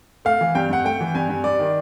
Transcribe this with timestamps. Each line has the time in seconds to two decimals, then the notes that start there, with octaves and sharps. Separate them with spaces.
0.25 A3 F5
0.41 E3
0.55 G2 G5
0.70 G2 F#5
0.85 A3 G5
1.01 E3
1.15 G2 G#5
1.29 G2
1.44 G3 D5
1.59 D#3